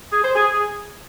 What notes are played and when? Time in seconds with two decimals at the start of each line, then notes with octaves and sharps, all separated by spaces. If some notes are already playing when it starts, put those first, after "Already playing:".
0.11 G#4
0.23 C5
0.35 G#4